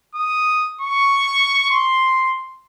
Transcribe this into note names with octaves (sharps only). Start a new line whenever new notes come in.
D#6
C#6
C6